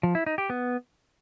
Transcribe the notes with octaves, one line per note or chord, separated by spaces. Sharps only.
F3
E4
D#4
G4
B3